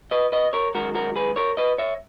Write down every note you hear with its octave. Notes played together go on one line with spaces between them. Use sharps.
B4 D#5
B4 D#5
A#4 C#5
F#2 D#3 G#3 F#4 A#4
F#4 A#4
G#4 B4
A#4 C#5
B4 D#5
C#5 E5